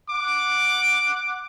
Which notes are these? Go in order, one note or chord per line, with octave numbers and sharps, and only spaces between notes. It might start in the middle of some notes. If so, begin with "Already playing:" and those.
F#5 D6